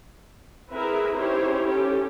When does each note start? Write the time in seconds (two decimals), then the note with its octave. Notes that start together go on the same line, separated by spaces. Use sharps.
0.71 C4 E4 G#4 A#4 B4 E5
1.15 C#4 D#4 E4 G4 C5 C#5
1.64 C#4 G4 A4